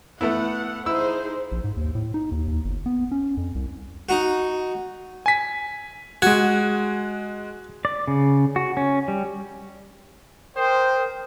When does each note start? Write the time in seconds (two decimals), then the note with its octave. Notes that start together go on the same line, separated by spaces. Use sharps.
0.21 A3 B3 E4 F#5
0.86 D#4 E4 G#4 C5 E6
1.52 A#1
1.64 G#2
1.77 D#2
1.95 A2
2.14 D#4
2.31 D#2
2.48 D#2
2.64 G1
2.86 B3
3.11 C#4
3.37 F2
3.55 C2
4.09 D#4 F#4
5.26 G#5 B6
6.22 G#3 F#4 G#6
7.85 D5
8.08 C#3
8.56 F#4
8.77 C#4
9.08 G3
10.56 A#4 C5 G5 D#6